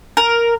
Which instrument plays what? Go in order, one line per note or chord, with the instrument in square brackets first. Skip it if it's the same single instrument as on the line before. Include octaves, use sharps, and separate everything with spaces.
[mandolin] A#4